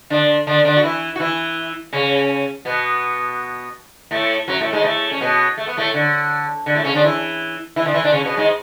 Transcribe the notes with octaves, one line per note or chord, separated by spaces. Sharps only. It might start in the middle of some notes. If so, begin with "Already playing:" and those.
D3 D4
D3 D4
D3 D4
F#4
E3 E4
F#4
E3 E4
C#3 C#4
B2 B3
A2 A3
F#2 F#3
A2 A3
G#2 G#3
A2 A3
C#4
B2 B3
A3
B3
A2 A3
D3
D3
A2 A3
C#3 C#4
D3 D4
E3 E4
E3 E4
D3 D4
E3 E4
D3 D4
C#3 C#4
B2 B3
G#2 G#3